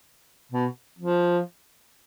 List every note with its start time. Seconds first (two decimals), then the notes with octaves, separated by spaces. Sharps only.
0.53 B2
0.99 F3